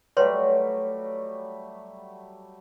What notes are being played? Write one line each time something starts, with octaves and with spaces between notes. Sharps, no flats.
F#3 G3 A3 B4 C#5 C6